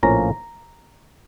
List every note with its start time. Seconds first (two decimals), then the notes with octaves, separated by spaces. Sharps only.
0.03 A#1 A2 F3 A#3 C#4 A#5